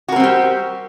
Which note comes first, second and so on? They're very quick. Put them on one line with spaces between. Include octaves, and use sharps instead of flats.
F#4 A#4 C4 G3 G4